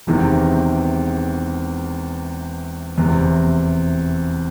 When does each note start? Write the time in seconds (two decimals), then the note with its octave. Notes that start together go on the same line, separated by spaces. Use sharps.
0.07 E1 E2 C3 D#3
2.97 F1 E2 C3